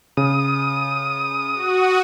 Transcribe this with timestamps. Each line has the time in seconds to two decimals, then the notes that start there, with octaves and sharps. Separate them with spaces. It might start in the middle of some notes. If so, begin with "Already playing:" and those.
0.17 C#3 D#6
1.55 F#4